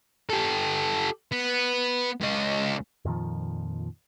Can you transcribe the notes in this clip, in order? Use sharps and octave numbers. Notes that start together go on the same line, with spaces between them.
G4 A4
B3
C#2 D#5
F2 A#2 D#3 F3